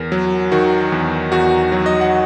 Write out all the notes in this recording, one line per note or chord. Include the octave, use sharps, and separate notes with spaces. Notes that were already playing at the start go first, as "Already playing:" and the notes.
Already playing: E2 A#4
F#3
D#3 F#4
E2
E2 F#4
F#3
D#5
F#5